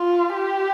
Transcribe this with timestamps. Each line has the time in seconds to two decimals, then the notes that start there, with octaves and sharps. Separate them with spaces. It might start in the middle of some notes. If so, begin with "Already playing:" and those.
Already playing: F4
0.34 G4